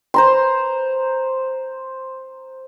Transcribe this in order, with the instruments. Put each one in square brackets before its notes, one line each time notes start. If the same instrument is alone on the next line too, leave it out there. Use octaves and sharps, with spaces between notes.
[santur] C5 A#5 C6